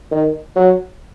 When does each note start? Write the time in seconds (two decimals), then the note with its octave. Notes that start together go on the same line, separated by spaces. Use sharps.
0.11 D#3
0.56 F#3